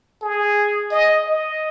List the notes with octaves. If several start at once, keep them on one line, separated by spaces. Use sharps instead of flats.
G#4
D#5
D#5